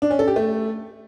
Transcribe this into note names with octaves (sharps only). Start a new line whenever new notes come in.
D4
C#4
A4
G4
A3